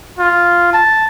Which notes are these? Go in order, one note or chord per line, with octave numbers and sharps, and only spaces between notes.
F4
A5